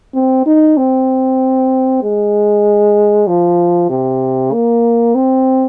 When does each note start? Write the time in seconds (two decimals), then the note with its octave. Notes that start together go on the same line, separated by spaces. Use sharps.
0.14 C4
0.46 D#4
0.77 C4
2.03 G#3
3.27 F3
3.90 C3
4.52 A#3
5.15 C4